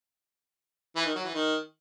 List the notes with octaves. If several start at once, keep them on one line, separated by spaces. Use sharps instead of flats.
E3
D#3
F#3
E3
D#3